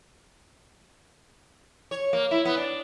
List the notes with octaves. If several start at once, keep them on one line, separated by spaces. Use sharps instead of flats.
C#5
A#3
E4
B3
D4